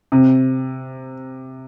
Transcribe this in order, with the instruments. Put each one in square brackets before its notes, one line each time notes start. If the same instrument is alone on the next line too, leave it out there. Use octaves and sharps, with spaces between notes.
[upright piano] C3